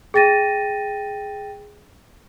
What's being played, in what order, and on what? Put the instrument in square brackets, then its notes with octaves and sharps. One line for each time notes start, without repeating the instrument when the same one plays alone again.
[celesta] G#4 G5 A6 A#6 D#7